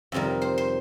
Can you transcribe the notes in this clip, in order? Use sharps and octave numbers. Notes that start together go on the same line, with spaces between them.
F2 C3 D#3 G3 A#4
C5
C5